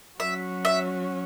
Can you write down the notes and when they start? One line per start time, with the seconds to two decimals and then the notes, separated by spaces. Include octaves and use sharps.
0.20 F#3 C#4 F#4 E5
0.65 E5